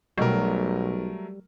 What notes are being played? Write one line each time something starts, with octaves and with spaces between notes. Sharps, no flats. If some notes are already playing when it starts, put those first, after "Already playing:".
B1 B2 F#3 G3 A3 A#4